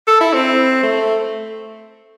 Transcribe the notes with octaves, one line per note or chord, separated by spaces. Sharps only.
A4
E4
C4
A3